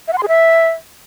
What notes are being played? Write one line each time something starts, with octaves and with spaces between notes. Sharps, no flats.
E5
F#5
C6
G#4
E5